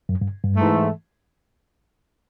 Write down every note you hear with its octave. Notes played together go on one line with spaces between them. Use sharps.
F#2
G2
G2
G#2 E3 A3